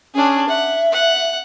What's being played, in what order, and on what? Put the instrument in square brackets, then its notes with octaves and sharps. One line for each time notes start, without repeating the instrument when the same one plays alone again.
[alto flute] C#4 [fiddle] D4 G#4
[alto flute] E5 [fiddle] F#5
[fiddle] F#5